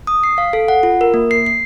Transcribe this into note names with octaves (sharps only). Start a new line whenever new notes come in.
D#6
C7
F5
A4
F#5
F4
A#4
A#3
C7
C7